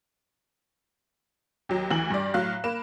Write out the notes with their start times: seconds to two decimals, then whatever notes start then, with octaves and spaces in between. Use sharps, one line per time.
1.69 D#2 F#3
1.91 D2 E3 F#7
2.10 G2 D5
2.34 A2 F#3 F5 F#6
2.64 A#3 B5 E7